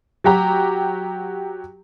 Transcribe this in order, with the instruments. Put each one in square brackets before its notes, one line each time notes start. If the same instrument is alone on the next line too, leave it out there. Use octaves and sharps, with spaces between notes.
[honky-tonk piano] F#3 F#4 G4 A#5